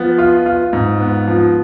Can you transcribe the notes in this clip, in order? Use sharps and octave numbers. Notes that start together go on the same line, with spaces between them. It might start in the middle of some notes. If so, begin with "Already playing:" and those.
Already playing: F3 B3
F4
F4
G#2
B3
F3